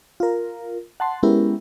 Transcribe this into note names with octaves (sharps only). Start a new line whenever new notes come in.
F4 A#4
F#5 A5 C6
G#3 B3 C#4 E4 G4 A#4